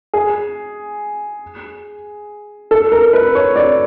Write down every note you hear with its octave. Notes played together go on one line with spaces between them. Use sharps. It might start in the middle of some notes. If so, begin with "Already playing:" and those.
G#4
A4
A#4
B4
C#5
D5